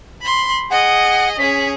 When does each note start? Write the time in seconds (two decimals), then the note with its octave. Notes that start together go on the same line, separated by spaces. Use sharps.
0.21 B5 C6
0.71 G#4 D#5 F#5
1.39 C#4 G#4 B6